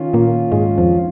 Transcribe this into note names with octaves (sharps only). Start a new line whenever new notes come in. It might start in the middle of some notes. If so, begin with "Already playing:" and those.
Already playing: D#3 C#4 F4
A#2 A#3
G#2 G#3
F2 F3